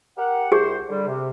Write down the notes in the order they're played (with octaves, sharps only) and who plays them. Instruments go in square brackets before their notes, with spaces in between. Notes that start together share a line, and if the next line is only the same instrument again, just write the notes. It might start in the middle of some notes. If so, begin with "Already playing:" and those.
[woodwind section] G4 A#4 F#5
[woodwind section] C2 C5 [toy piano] G4 G#4
[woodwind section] D3 G3
C3